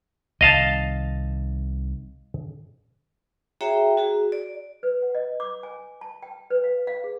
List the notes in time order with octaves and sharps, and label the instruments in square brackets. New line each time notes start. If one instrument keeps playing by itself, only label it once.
[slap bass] C2 D#3 [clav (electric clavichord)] D#5 F5 A5
[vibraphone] F#4 G#4 C#5 E5 G5 A#5
F#4 G#4
D5
[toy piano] B4
F#5
D#5
D6
G#5
A5
G5
B4
F5
F5
G#4